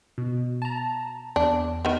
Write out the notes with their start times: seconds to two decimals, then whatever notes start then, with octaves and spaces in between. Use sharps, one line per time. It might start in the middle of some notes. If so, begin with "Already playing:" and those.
0.18 B2
0.62 A5 A#5
1.36 E2 D4
1.85 D#3 B3